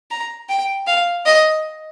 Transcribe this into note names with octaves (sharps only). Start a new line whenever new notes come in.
A#5
G5
F5
D#5